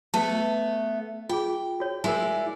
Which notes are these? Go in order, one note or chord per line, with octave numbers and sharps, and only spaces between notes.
A3 B3 A5
F4 G#4 G5
F#4 C#5
G#3 E4 A#4 D5 G#5